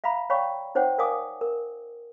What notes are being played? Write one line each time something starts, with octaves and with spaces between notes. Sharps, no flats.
E5 F5 A#5 B5
C#5 D5 F5 G5 B5 C#6
D#4 C5 C#5 F#5 G5
A#4 D5 F5 G#5 D6 D#6
A#4